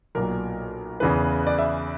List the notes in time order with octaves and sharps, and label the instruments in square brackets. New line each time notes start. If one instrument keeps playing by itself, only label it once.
[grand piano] B1 A#2 F#3 A#4
E2 C#3 E3 B4
D5
E5